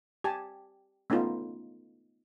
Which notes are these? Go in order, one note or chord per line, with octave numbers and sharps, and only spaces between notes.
G4 G#5 A5
A3 B3 C#4 D#4 F4